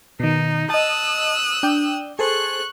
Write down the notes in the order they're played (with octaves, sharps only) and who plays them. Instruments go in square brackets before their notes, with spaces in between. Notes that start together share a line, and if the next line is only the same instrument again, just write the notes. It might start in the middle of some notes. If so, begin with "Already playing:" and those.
[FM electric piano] B2 D#3 [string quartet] D#4
[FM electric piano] D#5 A5 [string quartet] D#6 E6 F#6
[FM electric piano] D4 G5
[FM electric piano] G#4 A4 C5 [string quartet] C#6 F#6